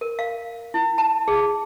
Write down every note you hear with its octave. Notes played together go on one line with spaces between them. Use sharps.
A#4
F5
E4
A5
G#4